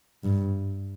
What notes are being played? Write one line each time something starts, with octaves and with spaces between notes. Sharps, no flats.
G2